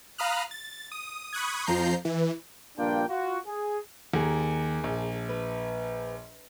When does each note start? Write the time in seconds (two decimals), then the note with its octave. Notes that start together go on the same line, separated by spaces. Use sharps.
0.18 F5 A#5 B5 D#6 F6 F#6
0.51 A6
0.92 D#6
1.33 B5 C#6 D#6 F#6 G#6
1.66 F2 F3 A#5 G6 C7
2.05 E3
2.78 A#1 G2 A#3 D4 F4 G5
3.08 F4 F#4
3.46 G#4
4.14 D#2 G#4 A#4
4.84 A#1
5.29 B4